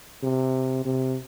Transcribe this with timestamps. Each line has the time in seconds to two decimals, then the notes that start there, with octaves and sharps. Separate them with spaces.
0.23 C3
0.85 C3